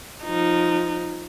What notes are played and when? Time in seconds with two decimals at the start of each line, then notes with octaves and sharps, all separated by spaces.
0.23 F3 D#4